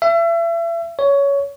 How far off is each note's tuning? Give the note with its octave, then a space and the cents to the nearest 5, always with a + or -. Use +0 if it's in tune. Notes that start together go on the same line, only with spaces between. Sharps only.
E5 +35
C#5 +15